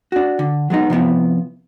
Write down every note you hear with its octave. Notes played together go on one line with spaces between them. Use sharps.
D4 F#4
D3
F#3 G#3 B3 D#4
C3 F3 B3 E4